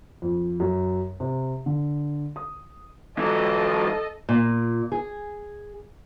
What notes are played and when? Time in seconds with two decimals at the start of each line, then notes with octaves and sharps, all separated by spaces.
0.22 F2
0.60 F#2
1.20 C3
1.66 D3
2.36 D#6
3.18 E3 F#3 A4 D#5
4.29 A#2
4.92 G#4